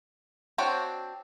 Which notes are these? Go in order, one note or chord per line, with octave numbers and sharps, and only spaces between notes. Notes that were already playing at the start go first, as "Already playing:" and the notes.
C4 D4 F#4 C#5 G5